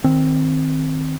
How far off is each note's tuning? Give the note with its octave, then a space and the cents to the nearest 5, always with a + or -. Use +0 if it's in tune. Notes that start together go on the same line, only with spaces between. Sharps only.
D#3 +0 C4 +0